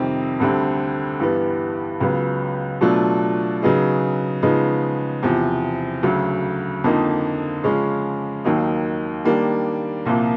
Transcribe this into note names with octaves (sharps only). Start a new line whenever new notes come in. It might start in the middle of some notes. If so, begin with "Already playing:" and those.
Already playing: F2 C3 D#3 G3 C4
D2 D3 G3 C4
G2 E3 G3 B3
C#2 C#3 F#3 B3
B2 F#3 A3 D4 F4
C#3 F#3 B3 D#4 G#4
C#3 F3 G#3 B3 D#4
E2 C3 F3
D2 C#3 F#3
F2 D3 F3 A#3 D#4
C#3 F3 G#3 C#4
D#2 D#3 F#3 A#3 D#4
D#3 G3 A#3 D4
C2 A#2 F3 A#3